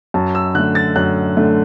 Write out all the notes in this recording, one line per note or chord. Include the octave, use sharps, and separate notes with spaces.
F#2 A5
E6
D3 A3 F#6
A6
F#2 F#6
D3 A3